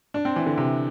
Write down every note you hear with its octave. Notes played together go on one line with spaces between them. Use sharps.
D4
C4
E3
D3
C3